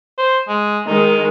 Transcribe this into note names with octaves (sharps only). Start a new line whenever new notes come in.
C5
G#3
D#3 G#3 D#4